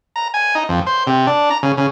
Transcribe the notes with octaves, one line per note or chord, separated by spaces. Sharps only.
A#5
G#5
D#4
F2
C5
C3
D4
A#5
C#3
C#3